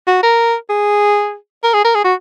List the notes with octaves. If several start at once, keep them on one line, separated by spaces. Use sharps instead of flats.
F#4
A#4
G#4
A#4
G#4
A#4
G#4
F#4